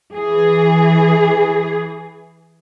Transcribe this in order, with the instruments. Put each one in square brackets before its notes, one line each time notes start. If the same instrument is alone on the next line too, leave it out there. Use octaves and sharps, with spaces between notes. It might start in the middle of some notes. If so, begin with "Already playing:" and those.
[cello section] E3 G#4